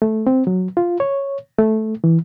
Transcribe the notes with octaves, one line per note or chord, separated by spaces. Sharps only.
A3
C4
F#3
F4
C#5
A3
E3